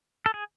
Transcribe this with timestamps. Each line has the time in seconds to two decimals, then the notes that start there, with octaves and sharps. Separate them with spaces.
0.26 A4
0.34 G#4